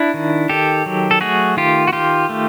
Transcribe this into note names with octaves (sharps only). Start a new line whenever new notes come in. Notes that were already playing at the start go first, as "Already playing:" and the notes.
Already playing: D4 E4
D#3
D#3 G4 A4
F#3
A4
A3 F#4 G#4
D#3 F4 G4
F#4
D#3 F4 G4
A3